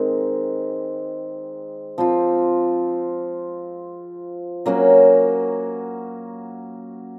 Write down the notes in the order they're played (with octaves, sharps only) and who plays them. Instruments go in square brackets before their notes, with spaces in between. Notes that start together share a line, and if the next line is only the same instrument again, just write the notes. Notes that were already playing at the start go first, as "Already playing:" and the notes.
Already playing: [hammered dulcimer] D#3 G#3 C4 D#4
F3 C4 F4
F#3 A#3 C#4 F#4